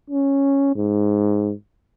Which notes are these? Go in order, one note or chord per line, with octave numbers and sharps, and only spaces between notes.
C#4
G#2